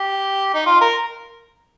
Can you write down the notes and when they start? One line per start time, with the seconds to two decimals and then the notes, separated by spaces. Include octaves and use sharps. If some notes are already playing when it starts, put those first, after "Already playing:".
Already playing: G4
0.54 D#4
0.66 F4
0.81 A#4